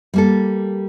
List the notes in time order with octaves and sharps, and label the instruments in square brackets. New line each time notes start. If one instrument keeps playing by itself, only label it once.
[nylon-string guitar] G3 A#3 A4